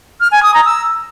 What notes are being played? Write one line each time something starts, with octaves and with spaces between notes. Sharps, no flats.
F6
G#5
D#6
A#5
E6